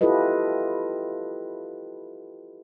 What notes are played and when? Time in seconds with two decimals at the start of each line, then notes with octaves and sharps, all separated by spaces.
0.01 E4 F4 G4 A4 B4 D#5